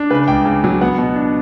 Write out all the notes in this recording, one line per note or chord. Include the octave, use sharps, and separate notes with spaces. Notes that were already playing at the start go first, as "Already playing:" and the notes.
Already playing: D4
C#3 B4
C#2 G5
C#3
F#3
B3 F#5
B2
D4